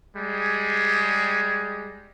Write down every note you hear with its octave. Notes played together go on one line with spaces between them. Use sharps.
G3 G#3 G#4